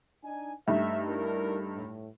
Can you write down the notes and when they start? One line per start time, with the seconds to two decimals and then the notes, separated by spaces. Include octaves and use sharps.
0.24 D4 D#4 G#5
0.68 G2 A3 D#4 E5
1.08 D4 E4 A#4
1.75 A2